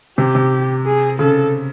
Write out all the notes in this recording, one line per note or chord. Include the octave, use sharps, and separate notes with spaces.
C3 G4
C3
G#4
C#3 A4